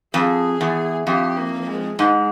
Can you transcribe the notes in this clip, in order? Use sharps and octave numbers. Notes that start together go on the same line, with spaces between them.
F2 G#4
E2
F2 G4
A#3
G#3
G#2 G#3